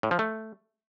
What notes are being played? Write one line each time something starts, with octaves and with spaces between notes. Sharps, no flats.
A2
F3
A3